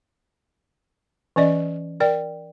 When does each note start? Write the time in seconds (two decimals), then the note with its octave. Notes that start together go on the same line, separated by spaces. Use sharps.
1.36 E3 C#4 D5 D#5
2.00 A#4 D5 G5